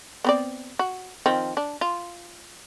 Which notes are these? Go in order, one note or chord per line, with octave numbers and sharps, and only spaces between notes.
B3 C4 D5
F#4
D#3 F3 C4
D4
F4